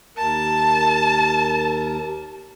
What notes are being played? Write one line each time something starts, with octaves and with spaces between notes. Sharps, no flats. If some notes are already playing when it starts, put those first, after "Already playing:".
D#2 A#4 A5